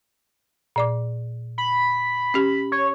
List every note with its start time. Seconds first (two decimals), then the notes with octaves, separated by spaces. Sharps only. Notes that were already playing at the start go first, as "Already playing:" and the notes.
0.76 A#2 D5 D6
1.58 B5
2.34 C#4 G4
2.72 C#5